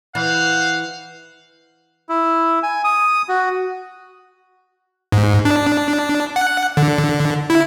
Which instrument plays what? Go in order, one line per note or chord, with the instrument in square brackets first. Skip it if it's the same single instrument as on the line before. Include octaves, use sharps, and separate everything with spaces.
[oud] E3 [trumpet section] C5 F5 [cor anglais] F#5
[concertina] E4
G#5
D#6
F#4
[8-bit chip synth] G#2
D4
F#5
D3
E4